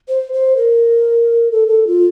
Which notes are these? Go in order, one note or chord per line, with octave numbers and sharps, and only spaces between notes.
C5
C5
A#4
A4
A4
F4